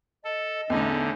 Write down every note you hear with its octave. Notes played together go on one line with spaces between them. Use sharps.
A4 D#5
E2 A2 D3 C#4 D#4